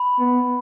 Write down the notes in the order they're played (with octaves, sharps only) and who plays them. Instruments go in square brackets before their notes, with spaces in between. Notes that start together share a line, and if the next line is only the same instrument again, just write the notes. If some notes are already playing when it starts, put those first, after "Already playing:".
Already playing: [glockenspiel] B5
[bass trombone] B3